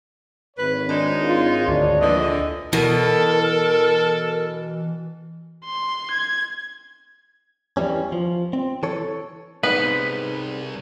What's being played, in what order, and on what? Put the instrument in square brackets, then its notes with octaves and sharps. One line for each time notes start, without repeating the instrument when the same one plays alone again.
[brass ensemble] G#1 C#5 [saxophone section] B4
[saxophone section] G#3 D#4 [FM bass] D4
[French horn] F4
[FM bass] D2 [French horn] D4
[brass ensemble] A#1 D#5 [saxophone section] F2 D3 E3
[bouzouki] B2 [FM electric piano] E3 [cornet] A4 [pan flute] A#4
[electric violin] C6
G#6
[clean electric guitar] E2 E3 G3 C#4
F3
C4
E3 A4 C#5
[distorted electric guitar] C2 [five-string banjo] B3 [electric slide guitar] D#4 G#4 F#5 [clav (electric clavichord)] B4